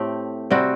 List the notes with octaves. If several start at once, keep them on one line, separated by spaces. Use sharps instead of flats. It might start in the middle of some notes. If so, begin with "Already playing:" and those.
Already playing: A2 A3 C4 G4
C3 G3 C4 F#4